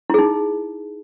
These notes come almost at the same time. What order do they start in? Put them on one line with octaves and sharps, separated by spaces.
E4 G#4 D#4